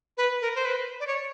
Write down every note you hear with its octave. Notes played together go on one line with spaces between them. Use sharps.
B4
A#4
C5
B4
D5
C#5